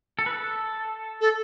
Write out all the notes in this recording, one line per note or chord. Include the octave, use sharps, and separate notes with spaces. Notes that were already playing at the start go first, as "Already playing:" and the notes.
A4
B4
A4
A4